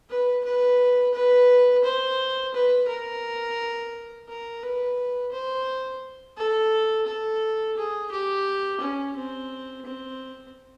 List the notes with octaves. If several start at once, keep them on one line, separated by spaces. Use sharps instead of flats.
B4
B4
B4
C5
B4
A#4
A#4
B4
C5
A4
A4
G#4
G4
C#4
C4
C4